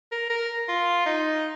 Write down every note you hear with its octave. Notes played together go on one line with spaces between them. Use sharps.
A#4
A#4
F4
D#4